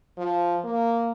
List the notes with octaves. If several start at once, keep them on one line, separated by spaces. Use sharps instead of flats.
F3
A#3